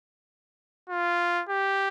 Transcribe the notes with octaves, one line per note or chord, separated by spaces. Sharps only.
F4
G4